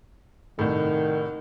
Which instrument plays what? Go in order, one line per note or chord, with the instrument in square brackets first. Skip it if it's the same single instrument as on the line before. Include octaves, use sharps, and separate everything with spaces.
[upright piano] C2 A2 [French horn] D#3